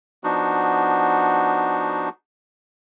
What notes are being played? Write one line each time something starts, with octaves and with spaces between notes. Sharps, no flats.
F3 B3 D4 D#4 F#4